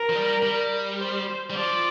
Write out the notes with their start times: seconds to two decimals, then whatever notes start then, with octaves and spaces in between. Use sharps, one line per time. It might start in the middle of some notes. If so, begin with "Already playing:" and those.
Already playing: A#4
0.09 F3
0.15 G3
0.43 G3
1.00 C5
1.50 G3
1.56 F3 D5